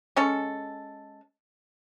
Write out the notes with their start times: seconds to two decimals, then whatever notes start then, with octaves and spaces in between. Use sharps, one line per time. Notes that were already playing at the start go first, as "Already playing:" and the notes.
0.16 G#3 C#4 A4